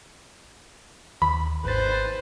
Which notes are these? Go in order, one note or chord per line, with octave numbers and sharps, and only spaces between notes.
D#2 B5
G#1 B4 C5 A6